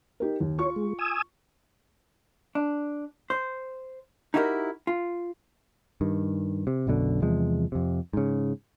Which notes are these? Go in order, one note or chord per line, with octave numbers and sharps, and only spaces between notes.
D#4 G4 A#4
D#2
F4 C#5 C#6
G#3
G#5 D#6 E6
D4
C5
D#4 E4 F#4 G4 A4 A#4
F4
G2 D#3
C3
B1 F#2 B2 D3
E2 C3 F3 G#3
F2 C3
G#2 C#3